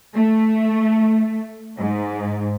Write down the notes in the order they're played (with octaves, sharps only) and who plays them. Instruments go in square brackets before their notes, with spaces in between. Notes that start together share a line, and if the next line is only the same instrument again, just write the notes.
[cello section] A3
G#2